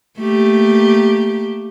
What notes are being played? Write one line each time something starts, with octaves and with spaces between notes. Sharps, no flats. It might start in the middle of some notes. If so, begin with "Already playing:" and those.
A3 A#3 G4